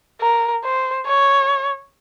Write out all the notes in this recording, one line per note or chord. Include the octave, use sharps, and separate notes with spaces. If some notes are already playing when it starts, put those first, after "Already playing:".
A#4
C5
C#5